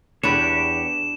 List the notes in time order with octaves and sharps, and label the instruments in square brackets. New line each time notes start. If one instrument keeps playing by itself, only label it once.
[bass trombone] E2 [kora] D4 B4 [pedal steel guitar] G4 C#5 [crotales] E7